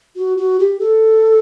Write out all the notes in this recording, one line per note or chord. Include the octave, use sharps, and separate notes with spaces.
F#4
F#4
G4
A4